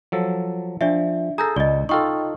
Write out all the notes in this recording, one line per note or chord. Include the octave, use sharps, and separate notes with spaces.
F3 F#3 A4
F3 D4 D5 E5
G#4 A4 A#5 G6 A#6
C#2 D5 D#5
D#4 F4 A4 G5 C#6